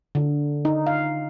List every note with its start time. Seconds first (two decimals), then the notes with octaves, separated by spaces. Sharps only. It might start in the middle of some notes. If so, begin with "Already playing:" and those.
0.15 D3
0.65 D#4
0.87 F5